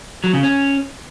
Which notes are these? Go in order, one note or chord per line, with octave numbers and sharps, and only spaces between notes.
F#3
C#3
C#4